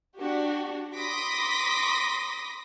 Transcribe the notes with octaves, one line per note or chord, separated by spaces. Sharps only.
D4 F#4 G4
B5 C6 D6 D#6 A#6 B6